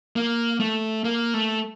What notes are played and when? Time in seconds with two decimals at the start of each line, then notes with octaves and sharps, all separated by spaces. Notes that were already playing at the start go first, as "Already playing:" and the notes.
0.16 A#3
0.60 A3
1.04 A#3
1.34 A3